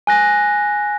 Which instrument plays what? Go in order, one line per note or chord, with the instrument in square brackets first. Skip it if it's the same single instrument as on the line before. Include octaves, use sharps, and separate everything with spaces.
[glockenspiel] G#5 F#6 A#6